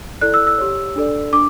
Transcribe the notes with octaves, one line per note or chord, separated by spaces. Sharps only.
E4 A4 D5 F#6
E6
E6
G4 C#5
D4 A4 D5
D4 D6